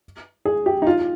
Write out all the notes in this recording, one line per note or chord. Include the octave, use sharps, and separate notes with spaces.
G#4
G4
D#4
F4